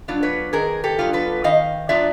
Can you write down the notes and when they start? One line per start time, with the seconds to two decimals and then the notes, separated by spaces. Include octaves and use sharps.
0.08 F#3 B3 D4 F4
0.23 B4 C#5
0.53 D#3 G#4 A#4
0.84 G4 A4
0.99 F#3 B3 D4 F4
1.13 A4 B4
1.44 D#3 D#5 F5
1.89 F#3 B3 D4 F4 D5 E5